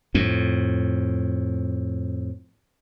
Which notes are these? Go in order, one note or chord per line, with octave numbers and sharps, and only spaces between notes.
F2 A2